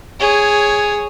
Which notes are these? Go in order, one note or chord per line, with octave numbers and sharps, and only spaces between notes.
G#4 C#5